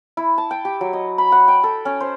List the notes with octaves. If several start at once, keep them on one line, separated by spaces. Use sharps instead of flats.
E4
A5
G5
G4
F#3
D#5
B5
F#5
G5
A4
C#4
C5